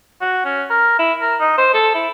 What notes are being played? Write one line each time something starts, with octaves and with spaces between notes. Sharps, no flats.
F#4
C#4
A#4
E4
A#4
D#4
C5
A4
E4